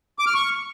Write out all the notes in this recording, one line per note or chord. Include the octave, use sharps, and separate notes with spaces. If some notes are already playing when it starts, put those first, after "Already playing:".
D6
F6
C#6